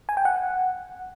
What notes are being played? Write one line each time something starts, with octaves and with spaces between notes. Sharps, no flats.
G#5
G5
F#5